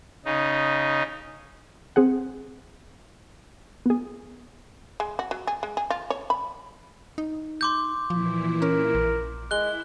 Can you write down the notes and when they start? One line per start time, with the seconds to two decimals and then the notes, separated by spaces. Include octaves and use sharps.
0.25 C#3 D#4
1.96 C4 G#4 F#5
3.86 B3 G#4
5.00 G#3
5.19 F#4
5.31 F#3
5.47 G#4
5.63 G#3
5.77 G#4
5.90 F4
6.10 C#5
6.30 B5
7.18 D#4
7.61 C6 D6 G6
8.10 A#2 E3 F3 E4
8.62 C#4 A#4
8.95 A#1
9.51 G#3 E4 F#6 G7